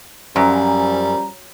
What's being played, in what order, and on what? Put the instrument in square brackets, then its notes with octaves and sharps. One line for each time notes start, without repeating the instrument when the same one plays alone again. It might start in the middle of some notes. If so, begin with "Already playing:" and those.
[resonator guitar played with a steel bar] F#2 [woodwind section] F3 C#4 [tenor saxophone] G3 [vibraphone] A#5